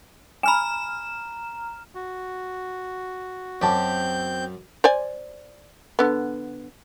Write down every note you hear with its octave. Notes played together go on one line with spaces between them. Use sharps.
G#5 A#5 B5 F6 E7
F#4
F#2 C4 G4 A5 A#5 G6
C5 D5 G#5
D3 B3